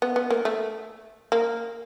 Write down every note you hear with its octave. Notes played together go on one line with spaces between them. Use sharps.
B3
B3
A#3
A3
A#3